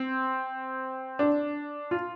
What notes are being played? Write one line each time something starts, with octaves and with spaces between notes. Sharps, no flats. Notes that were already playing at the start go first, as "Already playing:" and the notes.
Already playing: C4
D4
F4